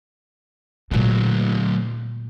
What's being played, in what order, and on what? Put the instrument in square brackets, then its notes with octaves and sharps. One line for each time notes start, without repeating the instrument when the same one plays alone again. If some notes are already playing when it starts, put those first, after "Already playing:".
[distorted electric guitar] D2 F#3 [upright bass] A#2 G#3